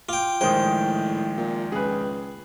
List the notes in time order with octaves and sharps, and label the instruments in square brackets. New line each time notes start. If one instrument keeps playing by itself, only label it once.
[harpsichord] F4 G5 [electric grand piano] D6
[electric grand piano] A#1 D#3 G#3 [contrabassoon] A2 [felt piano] C5 D#6 [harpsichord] G5
[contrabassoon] A#2
[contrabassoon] C#2 [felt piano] G#4 B4